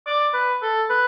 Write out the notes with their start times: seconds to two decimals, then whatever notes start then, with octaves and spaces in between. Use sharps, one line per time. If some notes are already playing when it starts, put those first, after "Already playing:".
0.06 D5
0.34 B4
0.63 A4
0.90 B4